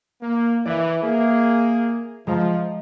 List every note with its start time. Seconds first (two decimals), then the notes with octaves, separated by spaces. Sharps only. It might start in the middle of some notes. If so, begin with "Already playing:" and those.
0.21 A#3
0.66 E3 D5 E5
1.02 A#3 G#4
2.27 F3 G#3 A#5